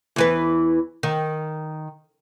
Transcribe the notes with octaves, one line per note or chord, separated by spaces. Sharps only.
E2 E3 B4
D#3